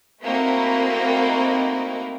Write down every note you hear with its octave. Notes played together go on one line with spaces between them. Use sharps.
A3 A#3 C4 D#4 E4 F#4